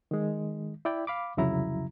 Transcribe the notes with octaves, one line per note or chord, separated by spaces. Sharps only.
D#3 G#3
E4 D5 G5
F5 B5 D6
C2 F2 C#3 F#3 E4 A#5